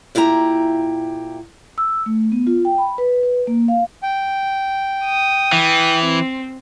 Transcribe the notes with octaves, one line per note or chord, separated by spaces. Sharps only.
A#2 E4 G4 A#4 A#5
E6
A3
B3
F4
G5
B5
B4
B4
A#3
F5
G5
D#6
E3
C4